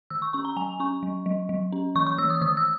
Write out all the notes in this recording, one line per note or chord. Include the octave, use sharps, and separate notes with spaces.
D#3 E6
C#6
C#4 C#6
A#5
F#3 G#5
C#4 C#6
F#3
F#3
F#3
C#4
E3 C#6
C#6
E3 E6
D#6
D#3 D#6
E6